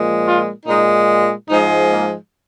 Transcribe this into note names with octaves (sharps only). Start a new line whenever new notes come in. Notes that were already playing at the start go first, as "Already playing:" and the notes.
Already playing: A#2 F3 G#3
F4
A#2 G#3 D#4
G#2 F3 G#3 D#4
A#3